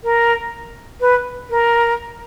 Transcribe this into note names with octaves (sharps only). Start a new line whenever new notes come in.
A#4
B4
A#4